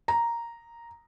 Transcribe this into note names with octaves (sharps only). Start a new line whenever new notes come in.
A#5